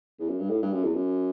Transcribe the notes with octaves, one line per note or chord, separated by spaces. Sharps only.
E2
F#2
G2
A2
G2
F#2
E2
F#2